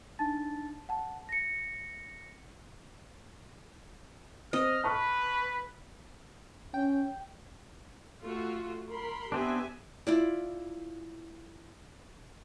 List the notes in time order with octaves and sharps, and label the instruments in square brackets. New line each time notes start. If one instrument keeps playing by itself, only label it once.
[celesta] D4 D#4 A5 A6
F#5 A5
A#6 C#7
[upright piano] C4 [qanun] D#5 [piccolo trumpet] F6
[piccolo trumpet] B4 [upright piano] A5 C#6 F6
[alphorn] C#4 [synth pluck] G5
[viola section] A3 F4 F#4
A#4 B5 C6
[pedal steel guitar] B3 C4 D4 [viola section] G4 E5 G#5
[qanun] E4 F4 D5